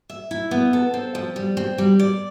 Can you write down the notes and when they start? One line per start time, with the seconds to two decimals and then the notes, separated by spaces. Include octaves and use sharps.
0.10 E5
0.31 E4
0.51 B3
0.73 A4
0.94 C4
1.15 F3
1.36 G3
1.57 C4
1.78 G3
1.99 D5